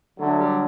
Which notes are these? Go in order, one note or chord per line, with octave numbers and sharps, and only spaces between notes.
D3 F#3 A3
G3